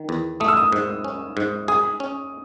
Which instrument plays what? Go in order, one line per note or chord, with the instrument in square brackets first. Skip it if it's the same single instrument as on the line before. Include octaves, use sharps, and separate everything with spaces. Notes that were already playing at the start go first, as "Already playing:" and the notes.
Already playing: [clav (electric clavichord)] D#3
E2
[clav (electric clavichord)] A3 [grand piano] D#6
[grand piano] E6
D#6
[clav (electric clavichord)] G#2
C#4
G#2
[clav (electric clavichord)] G#4 [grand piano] D#6
[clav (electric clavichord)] C#4